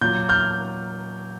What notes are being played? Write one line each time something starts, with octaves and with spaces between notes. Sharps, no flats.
A#2 F#3 G6
F6 G6